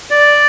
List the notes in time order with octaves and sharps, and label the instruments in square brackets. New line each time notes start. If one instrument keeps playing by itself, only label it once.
[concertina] D5